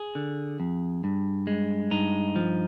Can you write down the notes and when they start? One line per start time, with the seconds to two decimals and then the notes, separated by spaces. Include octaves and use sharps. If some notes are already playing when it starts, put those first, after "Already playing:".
Already playing: G#4
0.15 D3
0.60 F2
1.04 G2
1.47 G#3
1.91 G2 D#4
2.36 F3